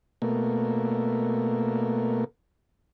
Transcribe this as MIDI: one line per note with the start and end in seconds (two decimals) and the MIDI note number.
0.22 2.24 47
0.22 2.24 57
0.22 2.24 58